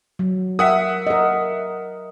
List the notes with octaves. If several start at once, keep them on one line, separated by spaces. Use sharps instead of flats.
F#3
A#4 E5 F#5 D#6
A#4 D#5